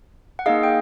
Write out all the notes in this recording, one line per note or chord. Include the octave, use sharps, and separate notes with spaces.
F#5
A#3 D#4 G#4 D#5 F5
G5